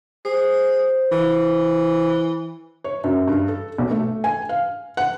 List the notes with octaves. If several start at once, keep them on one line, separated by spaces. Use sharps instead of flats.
G#4 C5
E3
C#5
F#2
G2
A4
B1
A3
G#5
F5
F#5